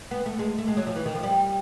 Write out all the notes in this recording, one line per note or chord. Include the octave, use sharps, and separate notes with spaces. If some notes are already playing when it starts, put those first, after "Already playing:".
B3
A3
G#3
A3
G#3
F#3
F3
E3
D#3
F3
G3